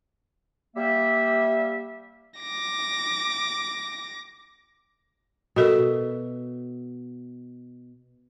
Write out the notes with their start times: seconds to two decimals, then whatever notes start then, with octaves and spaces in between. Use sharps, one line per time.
0.76 G3 A#3 E5
2.39 D6 A#6
5.56 B2 F#4 A4 A#4 E5